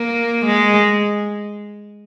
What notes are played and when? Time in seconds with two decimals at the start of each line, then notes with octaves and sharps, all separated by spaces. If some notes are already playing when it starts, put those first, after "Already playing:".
Already playing: A#3
0.46 G#3